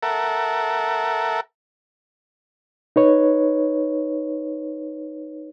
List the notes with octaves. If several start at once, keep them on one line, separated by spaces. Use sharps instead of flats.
A4 A#4 E5 F#5
D#4 B4 C#5